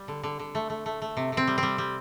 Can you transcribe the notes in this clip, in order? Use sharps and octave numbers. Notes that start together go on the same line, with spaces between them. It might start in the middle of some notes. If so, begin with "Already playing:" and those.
Already playing: G3
D3
D3
D3
A3
A3
A3
A3
C3
C3 C4
G3
C4
G3
G3